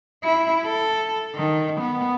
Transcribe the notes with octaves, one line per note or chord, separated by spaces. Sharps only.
E4
A4
D#3
B3